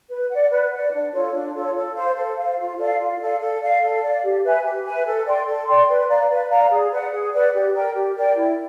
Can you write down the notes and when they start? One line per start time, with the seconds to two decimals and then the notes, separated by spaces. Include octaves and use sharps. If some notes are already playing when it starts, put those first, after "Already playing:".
0.09 B4
0.30 D5 F#5
0.50 B4
0.72 D5 F#5
0.91 D4
1.12 F4 A4 C#5
1.33 D4
1.54 F4 A4 C#5
1.75 A4
1.95 C5 F5
2.16 A4
2.36 C5 F5
2.56 F4
2.78 A4 D5 F5
2.98 F4
3.19 A4 D5 F5
3.40 A4
3.60 D5 F5
3.81 A4
4.02 D5 F5
4.22 G4
4.43 B4 E5 G#5
4.64 G4
4.84 B4 E5 G#5
5.05 A4
5.25 D5 G5 C6
5.46 A4
5.67 D5 G5 C6
5.88 B4
6.08 D5 F5 A#5
6.29 B4
6.50 D5 F5 A#5
6.70 G#4
6.91 B4 D5 F#5
7.11 G#4
7.31 B4 D5 F#5
7.53 G4
7.73 A#4 D5 G5
7.94 G4
8.15 A#4 D5 G5
8.35 E4